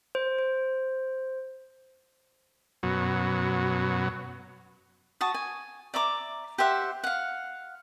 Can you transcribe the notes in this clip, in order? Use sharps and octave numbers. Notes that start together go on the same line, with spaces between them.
C5
C5
F#2 B2 F#3
F#4 A5 D#6
G#5
D5 E5 A#5 D6
G4 C5 E5 F#5
F5 F#5